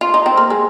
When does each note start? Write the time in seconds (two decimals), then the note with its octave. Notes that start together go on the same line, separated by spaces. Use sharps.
0.01 F4
0.14 D#4
0.26 C4
0.37 A#3
0.50 G#3